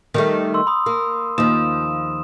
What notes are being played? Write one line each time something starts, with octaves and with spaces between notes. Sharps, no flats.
D#3 G3 A3
C6 E6
B5 D#6
A#3
D#2 F3 D#6 E7